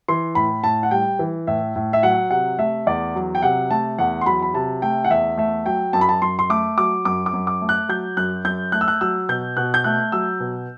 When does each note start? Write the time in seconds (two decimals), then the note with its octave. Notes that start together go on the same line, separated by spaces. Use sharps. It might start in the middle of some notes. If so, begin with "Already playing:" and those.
0.08 E3 C6
0.35 A2 B5
0.64 A2 A5
0.83 F#5
0.91 G3 G5
1.19 E3
1.47 A2 E5
1.76 A2
1.93 E5
2.03 F#3 F#5
2.30 C3 F#5
2.58 A3 E5
2.87 E2 D5
3.15 F#3
3.35 G5
3.42 C3 F#5
3.71 A3 A5
3.98 E2 F#5
4.21 C6
4.26 F#3 B5
4.42 B5
4.54 C3 A5
4.82 A3 G5
5.04 F#5
5.10 E2 E5
5.37 A3 E5
5.66 F#3 G5
5.93 F#2 A5
6.01 B5
6.09 A5
6.22 F#2 C6
6.39 C6
6.50 A3 D6
6.78 F#3 D6
7.05 F#2 D6
7.26 D6
7.33 F#2
7.47 D6
7.61 A3
7.69 F#6
7.89 F#3 G6
8.17 F#2 F#6
8.45 F#2 G6
8.72 A3 F#6
8.81 E6
8.88 F#6
9.01 F#3 E6
9.29 B2 G6
9.57 B2 F#6
9.74 G6
9.84 A3 F#6
10.12 F#3 E6
10.40 B2